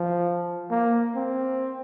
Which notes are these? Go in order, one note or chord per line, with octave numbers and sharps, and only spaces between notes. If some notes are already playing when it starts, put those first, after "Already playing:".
Already playing: F3
A#3
C4